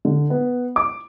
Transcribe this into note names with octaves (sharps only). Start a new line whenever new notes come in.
D3
B3
D6